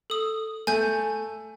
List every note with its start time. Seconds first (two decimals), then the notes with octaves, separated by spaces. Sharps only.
0.10 A4 D#6
0.67 A3 G#5 G6